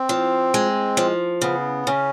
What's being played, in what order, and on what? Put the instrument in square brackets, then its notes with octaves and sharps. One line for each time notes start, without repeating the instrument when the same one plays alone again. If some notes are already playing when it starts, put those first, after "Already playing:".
Already playing: [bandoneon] C4
[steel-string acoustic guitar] F3
G#3
F3
[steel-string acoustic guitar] C#3 [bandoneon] B3
[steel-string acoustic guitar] C#3 [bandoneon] C#4